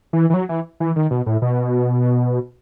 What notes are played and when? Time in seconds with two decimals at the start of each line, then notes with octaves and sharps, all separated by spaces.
0.13 E3
0.30 E3
0.34 F#3
0.49 E3
0.80 E3
0.96 D#3
1.11 B2
1.26 A2
1.42 B2